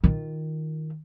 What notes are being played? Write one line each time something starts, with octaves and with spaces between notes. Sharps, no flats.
D#3 F4